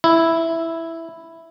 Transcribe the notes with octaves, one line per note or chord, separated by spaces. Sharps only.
E4